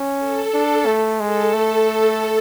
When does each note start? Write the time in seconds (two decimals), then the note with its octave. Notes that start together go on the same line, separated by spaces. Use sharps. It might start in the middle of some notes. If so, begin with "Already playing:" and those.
Already playing: C#4
0.19 A4
0.54 D4
0.86 A3
1.20 G#3 A4
1.54 A3